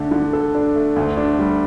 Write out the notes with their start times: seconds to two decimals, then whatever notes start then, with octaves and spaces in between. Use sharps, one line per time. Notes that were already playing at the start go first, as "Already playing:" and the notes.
Already playing: D3 A3 D4 A4
0.11 D3
0.33 A4
0.55 D4
0.75 A3
0.96 D2
1.17 D4
1.39 G3